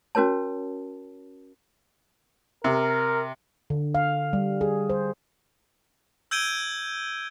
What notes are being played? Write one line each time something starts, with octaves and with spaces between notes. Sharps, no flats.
C#4 F#4 A#4 C#5 A5
C3 A#4
D3
F5
G3
G#4
C5
E6 G6 G#6 D7 D#7 G7